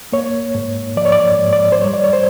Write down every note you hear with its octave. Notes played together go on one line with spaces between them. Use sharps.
A#3 C#5
G#2
F3 D5
C#5
D5
G#2
D5
C5
G3 C#5
D5
C#5
C5